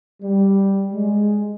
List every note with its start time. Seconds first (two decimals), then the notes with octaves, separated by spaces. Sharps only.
0.22 G3
0.92 G#3